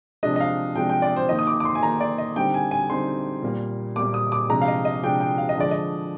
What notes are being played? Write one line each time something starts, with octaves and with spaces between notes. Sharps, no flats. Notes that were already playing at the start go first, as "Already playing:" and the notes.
C3 F3 G#3 D4 D#5
D#5
F5
C3 F3 G#3 D4 G5
G5
D5
C5
D#3 A#3 D#4 D#5
D#6
D6
D6
C6
G#5
D#3 A#3 D#4 A#5
D5
D#5
D3 G3 C4 D#4 G5
G#5
G#5
D3 G3 C4 D#4 C6
A#2 G3 A#3
A#2 G3 A#3 D6
D#6
D6
C3 F3 G#3 D4 A#5
F5
D#5
D#5
C3 F3 G#3 D4 G5
G5
F5
D#5
D3 F3 G#3 D5
D#5